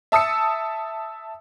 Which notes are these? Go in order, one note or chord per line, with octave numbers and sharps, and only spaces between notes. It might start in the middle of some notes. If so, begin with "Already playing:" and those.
E5 A5 D#6 E6 C#7